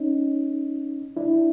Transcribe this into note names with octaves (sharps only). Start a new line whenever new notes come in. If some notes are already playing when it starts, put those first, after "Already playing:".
Already playing: C#4 D#4
D4 E4